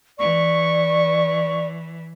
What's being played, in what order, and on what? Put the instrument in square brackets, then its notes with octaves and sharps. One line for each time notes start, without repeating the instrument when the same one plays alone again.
[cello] E3 [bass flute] D5 [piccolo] C#6